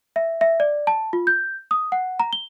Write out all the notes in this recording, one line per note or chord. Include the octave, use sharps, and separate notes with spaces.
E5
E5
D5
A5
F4
G6
D#6
F#5
A#5
G7